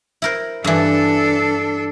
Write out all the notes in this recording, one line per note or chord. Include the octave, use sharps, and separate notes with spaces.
E4 A#4 C5
G2 E3 D4 A4